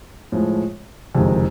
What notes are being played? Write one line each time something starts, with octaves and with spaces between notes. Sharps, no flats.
A2 F3 G#3
F#1 F2 C3 D#3 G#3